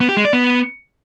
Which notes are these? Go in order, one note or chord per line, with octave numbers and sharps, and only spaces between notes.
B3
G4
G#3
D5
B3